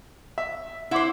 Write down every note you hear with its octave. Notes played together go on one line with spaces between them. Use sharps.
E5
E4 C5 F#5 C6 D6